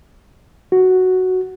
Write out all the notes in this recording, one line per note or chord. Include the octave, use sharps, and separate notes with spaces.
F#4